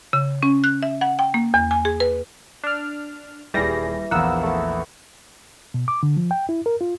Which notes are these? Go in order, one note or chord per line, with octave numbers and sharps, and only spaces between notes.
C#3
C#4
F#6
E5
F#5
G5
A#3
E2
G#5
G#4
B4
D4 F6
D#1 E3 G3 G#4 A#6
A#1 E2 A#3 B3 F#5 E6
A3 B3
B2
D6
D3
F3
G5
E4
A#4
F4